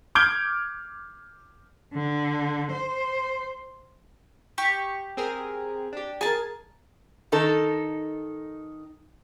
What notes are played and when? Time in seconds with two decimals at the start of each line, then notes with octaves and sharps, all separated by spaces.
0.15 D6 F6 G6 G#6 D7 G7
1.94 D3
2.72 C5
4.58 G4 C#6
5.17 C4 G#4 A#4
5.93 D4 G4
6.21 G#4 A#4 G#5 A5
7.32 D#3 D#4 A4